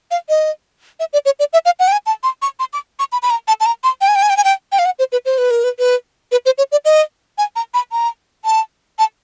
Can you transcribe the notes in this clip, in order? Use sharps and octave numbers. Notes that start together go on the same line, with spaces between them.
F5
D#5
E5
D5
C#5
D5
E5
F5
F#5
G5
G#5
A5
C6
C#6
C6
D6
C#6
B5
B5
A#5
A5
A5
A#5
C6
G5
G#5
G5
G#5
G5
G#5
G5
G5
F5
F#5
C5
B4
C5
B4
A#4
B4
B4
B4
C5
C#5
D5
D#5
G#5
A#5
B5
A#5
A5
A5